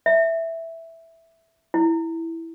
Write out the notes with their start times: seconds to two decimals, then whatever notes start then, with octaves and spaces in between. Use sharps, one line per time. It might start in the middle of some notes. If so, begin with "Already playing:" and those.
0.06 E5
1.74 E4